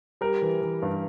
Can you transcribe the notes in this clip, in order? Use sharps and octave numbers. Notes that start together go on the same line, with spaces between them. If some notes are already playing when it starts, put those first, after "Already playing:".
G3 A#4
E3
E3
G2